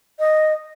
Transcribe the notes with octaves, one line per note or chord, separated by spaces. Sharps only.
D#5